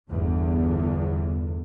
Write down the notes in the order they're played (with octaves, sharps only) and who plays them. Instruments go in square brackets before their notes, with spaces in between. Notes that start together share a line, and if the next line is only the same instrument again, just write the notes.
[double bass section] G1 E2 D3